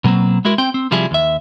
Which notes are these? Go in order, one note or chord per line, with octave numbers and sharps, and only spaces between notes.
B2 F#3 A#3 C4
G#3 E4 F#4 A#4
C4 G5
C4
C3 F3 G3 E4 F4 G#4
D#2 E5